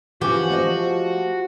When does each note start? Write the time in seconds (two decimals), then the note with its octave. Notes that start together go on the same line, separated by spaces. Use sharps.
0.21 E3 F3 C#4 F#4 G4
0.50 A3 C5 D#5